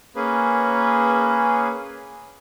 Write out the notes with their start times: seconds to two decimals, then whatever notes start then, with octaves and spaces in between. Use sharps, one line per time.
0.16 A#3 C#4 G#4 B4